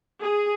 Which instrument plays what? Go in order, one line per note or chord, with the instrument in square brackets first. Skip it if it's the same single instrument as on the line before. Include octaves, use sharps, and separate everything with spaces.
[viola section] G#4